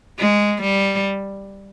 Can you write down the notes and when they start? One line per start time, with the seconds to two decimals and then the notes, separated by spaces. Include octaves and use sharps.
0.19 G#3
0.62 G3